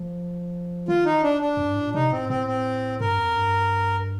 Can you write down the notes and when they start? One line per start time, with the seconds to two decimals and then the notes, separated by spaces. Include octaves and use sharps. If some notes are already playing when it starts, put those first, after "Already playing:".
Already playing: F3
0.88 D#3 F4
1.05 D#4
1.23 D4
1.42 D4
1.57 F2
1.67 G2
1.75 A2
1.85 A#2
1.94 C3 D#4
2.12 A2 C4
2.29 A2 C4
2.47 C4
3.01 G2 A#4
3.18 F2
3.36 G2